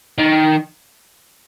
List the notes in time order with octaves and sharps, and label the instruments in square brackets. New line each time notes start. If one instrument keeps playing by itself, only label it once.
[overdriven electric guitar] D#3